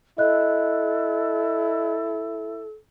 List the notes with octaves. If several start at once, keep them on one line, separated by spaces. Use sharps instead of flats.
E4 A4 D#5 F#6